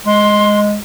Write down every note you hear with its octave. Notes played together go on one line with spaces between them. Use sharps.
G#3 C6